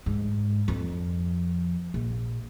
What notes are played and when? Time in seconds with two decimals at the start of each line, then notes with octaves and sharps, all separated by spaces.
0.06 G#2
0.68 F2
1.94 A#1